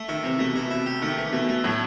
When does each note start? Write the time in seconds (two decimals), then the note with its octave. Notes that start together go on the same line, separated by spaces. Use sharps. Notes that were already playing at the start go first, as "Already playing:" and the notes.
Already playing: A3
0.08 D#3 E4
0.23 C3 E3
0.39 B2 A3
0.55 B2 E4
0.70 C3 E4
0.86 G4
1.02 D#3 A3
1.17 E3
1.32 B2 A3
1.49 A3
1.64 A2 F#3